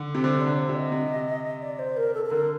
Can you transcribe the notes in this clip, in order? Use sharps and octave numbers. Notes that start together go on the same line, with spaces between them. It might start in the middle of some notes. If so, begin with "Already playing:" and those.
Already playing: D3
C3
D3 C5
D3 D5
C5
C3
D#5
C3
D5
C5
A#4
A4
A4
D3 A#4